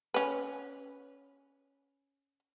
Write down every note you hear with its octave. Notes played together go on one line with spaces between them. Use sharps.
C#4 B4